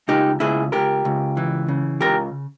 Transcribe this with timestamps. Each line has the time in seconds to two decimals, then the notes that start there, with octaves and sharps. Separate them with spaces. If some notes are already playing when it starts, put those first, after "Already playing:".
0.08 C#2 D#4 G4
0.40 C#2 E4 G#4
0.72 C#2 G4 A#4
1.05 C#2
1.37 E3
1.68 C#3
2.01 C#2 G4 A#4